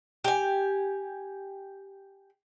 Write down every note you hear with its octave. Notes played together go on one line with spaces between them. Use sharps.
G4 G#5